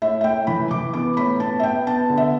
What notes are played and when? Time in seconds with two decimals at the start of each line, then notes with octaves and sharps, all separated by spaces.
0.02 A2 E5
0.21 E5
0.24 A2 G5
0.47 E3 B5
0.71 E3 D6
0.93 B3 D6
1.17 A2 B5
1.40 B3 A5
1.60 E5
1.63 B3 G5
1.87 B3 A5
2.10 D3
2.17 E5